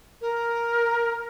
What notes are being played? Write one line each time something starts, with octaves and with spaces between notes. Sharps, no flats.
A#4